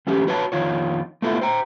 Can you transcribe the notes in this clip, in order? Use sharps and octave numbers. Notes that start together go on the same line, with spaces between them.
E3 F#3 A3 C#4 G4
F#4 B4 C#5 F5 A5
F2 D#3 F4 C#5
A3 B3 E4 F4 A4
C5 G5 A#5